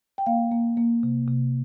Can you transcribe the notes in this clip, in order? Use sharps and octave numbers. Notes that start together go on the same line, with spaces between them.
G5
A#3 F5
A#3
A#3
C3
C3